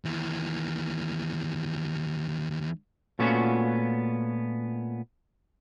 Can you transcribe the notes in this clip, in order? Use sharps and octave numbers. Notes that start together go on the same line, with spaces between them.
D#2 E3
A#2 A3 B3 C#4 F4 F#4